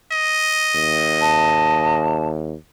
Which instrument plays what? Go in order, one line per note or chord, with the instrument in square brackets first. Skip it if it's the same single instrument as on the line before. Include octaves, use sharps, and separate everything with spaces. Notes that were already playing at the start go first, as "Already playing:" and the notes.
[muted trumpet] D#5
[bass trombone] D#2
[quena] A5